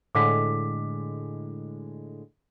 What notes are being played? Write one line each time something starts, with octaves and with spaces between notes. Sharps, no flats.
A2 D3 G#3 D6 B6